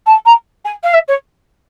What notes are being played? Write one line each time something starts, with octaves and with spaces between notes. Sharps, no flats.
A5
A#5
G#5
F5
E5
C#5